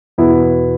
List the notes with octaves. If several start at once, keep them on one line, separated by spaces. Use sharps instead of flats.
E2 B2 B3 E4